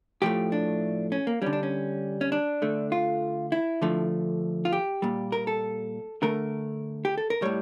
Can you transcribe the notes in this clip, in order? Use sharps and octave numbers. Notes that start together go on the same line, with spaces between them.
A2 F3 A3 G4
D4
C#4
A#3
D3 G3 C#4
D4
C#4
C#4
D4
D3 A3
F4
E4
D3 F3 A3
F4
G4
A#2 G3
A#4
A4
D3 A3 A#4
G4
A4
A#4
A2 G3 C#5